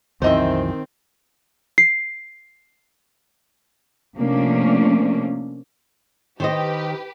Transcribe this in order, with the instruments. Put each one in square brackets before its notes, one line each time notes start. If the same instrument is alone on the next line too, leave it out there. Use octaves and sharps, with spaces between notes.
[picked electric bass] C2 F#2 E3 [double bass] D#3 C4 [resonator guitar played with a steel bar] C5 D#5 E5
[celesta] C7
[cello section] C3 F3 A3 A#3 C#4 D4
[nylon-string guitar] D#3 C5 D#5 [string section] G4 B4